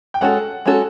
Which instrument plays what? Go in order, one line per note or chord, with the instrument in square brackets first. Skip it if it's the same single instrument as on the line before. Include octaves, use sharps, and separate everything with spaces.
[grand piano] G5
[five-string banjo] G#3 C#4 F#4 A4 [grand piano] F#5
[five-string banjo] G#3 C#4 F#4 A4